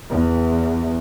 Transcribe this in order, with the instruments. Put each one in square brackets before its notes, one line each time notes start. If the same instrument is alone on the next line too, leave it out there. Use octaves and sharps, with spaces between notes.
[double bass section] E2